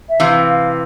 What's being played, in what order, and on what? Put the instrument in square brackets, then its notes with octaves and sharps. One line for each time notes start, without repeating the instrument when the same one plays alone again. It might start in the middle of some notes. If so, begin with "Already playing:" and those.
[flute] E5
[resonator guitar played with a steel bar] C3 E3 [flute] F5
[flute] F5